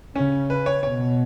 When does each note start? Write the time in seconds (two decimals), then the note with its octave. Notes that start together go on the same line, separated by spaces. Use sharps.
0.16 C#3 C#4
0.50 B4
0.66 C#5
0.83 B2 C#5